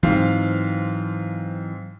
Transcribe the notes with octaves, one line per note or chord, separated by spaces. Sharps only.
G#2 E3 F#3 G#3 C4 F5